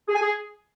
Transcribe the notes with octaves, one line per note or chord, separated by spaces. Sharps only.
G#4
G#5
G#4